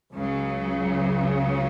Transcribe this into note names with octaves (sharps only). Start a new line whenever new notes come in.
C#2 C#3 F#3